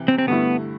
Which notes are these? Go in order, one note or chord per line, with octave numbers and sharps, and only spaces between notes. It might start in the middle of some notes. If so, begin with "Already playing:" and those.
Already playing: C3 E3
C4
C4
G2 D3 A3 B3 E4